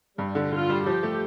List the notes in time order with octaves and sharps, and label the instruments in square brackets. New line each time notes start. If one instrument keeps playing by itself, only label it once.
[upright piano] G2 [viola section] G3
[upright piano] D3
[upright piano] D3 [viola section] F4
[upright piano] G3
[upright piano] F3 [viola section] G4
[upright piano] A3